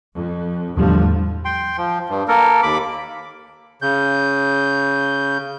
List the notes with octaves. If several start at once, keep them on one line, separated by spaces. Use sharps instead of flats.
F2
E2 A2 D3 F3 G3
G5 C6
F3
G2
A#3 A4 A#4
D#2 B5 D6
C#3 G6